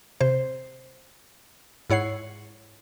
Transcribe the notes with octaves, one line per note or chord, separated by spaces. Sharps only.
C3 C5
G#2 E4 C#5 F#5 C7